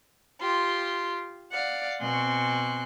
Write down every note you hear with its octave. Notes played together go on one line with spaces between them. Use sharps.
F4 G4 C6
D5 F5 F#5
B2 C4 G#5 C6 C#6 F#6